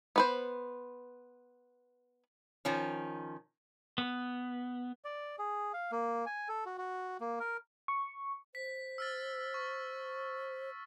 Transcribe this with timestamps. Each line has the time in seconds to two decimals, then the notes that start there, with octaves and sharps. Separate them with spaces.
0.16 B3 B4 C5
2.65 D#3 F3 C#4
3.98 B3
5.05 D5
5.39 G#4
5.73 F5
5.92 A#3
6.26 G#5
6.49 A4
6.66 F#4
6.78 F#4
7.20 A#3
7.40 A#4
7.88 C#6
8.55 C5 B6
8.98 E6 F6 A6
9.54 C#6